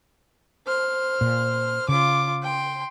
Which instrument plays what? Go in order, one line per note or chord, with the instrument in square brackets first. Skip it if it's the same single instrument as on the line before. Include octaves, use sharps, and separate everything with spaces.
[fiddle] C5 F6
[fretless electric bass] A#2
[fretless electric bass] C#3 [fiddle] F4 D6
[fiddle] G5 C6